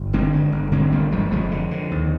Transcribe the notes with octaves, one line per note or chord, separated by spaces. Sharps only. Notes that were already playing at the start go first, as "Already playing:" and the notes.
Already playing: G1
D3 G#3 C4
G2
G1
D3 G#3 C4
G1 G3 A#3
G1 F3 G#3
F1 F3 G#3
D3
D3
D#2